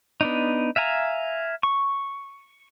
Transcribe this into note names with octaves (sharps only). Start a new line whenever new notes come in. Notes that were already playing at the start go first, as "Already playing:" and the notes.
B3 D4 D#4
E5 F5 G#5 A#5
C#6